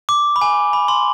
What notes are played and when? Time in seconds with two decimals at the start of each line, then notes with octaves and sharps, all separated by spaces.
0.09 D6
0.36 B5
0.41 G#5
0.73 B5
0.88 C6